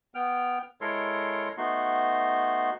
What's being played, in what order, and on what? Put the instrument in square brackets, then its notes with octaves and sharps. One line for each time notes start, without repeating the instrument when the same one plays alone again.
[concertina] B3 G5 F6
G#3 E4 A4 A#4 C#5 C6
A3 B3 D#4 F#4 C6